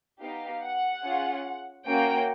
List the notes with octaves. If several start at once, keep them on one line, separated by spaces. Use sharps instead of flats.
B3 D#4 G4 F5
F#5
C#4 F4 G#4
A#3 C#4 F#4 G5